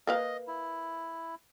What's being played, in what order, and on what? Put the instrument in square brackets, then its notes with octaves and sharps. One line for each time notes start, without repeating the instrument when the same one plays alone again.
[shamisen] A#3 B4 F5 [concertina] D#5
[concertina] E4